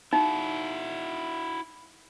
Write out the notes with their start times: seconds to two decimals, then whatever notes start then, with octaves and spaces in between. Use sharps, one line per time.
0.13 D#4 E4 F#4